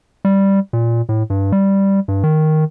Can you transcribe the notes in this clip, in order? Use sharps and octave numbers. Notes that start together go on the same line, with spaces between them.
G3
A#2
A2
G2
G3
G2
D#3